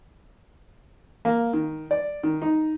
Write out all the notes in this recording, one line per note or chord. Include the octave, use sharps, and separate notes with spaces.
A#3
D#3
D5
D#3
D#4